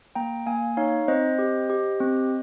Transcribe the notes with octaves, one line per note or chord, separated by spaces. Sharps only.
A#3 G5 A#5
A#3 F5 G#5
D#4 C#5 F5
C4 C5 D#5
G4
G4
C4